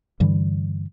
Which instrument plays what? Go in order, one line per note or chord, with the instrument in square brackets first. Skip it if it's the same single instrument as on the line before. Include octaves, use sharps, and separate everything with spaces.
[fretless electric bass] G2 D3 E3 G3